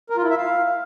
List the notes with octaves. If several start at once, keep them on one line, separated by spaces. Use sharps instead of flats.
A#4
F4
E4
E5
F5